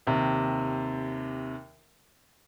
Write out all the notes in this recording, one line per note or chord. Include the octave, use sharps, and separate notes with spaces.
D#2 C3